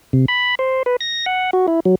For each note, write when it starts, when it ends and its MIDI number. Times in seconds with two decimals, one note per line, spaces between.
0.13 0.26 48
0.28 0.55 83
0.59 0.83 72
0.86 0.96 71
1.01 1.26 94
1.26 1.50 78
1.53 1.66 66
1.68 1.80 64
1.85 1.95 54